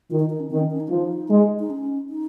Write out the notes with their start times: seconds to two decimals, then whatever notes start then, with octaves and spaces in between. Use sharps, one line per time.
0.10 D#3 F4
0.20 D#4
0.30 D#4
0.40 C#4
0.50 D#3 C4
0.60 C#4
0.70 C#4
0.80 D#4
0.89 F3
1.30 G#3
1.60 D#4
1.70 C#4
2.10 D#4